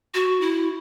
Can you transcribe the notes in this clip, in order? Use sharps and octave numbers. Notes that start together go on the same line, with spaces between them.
F#4
E4